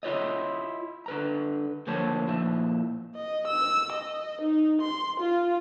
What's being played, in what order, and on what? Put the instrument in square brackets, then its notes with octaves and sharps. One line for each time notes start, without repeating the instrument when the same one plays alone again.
[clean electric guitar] E4 F4 C#5 D#5
D3 B4 A#5
D2 F3 A#3 C5 C#5 A5
A#2 F3 E4
[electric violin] D#5
E6
D#5
D#4
C6
F4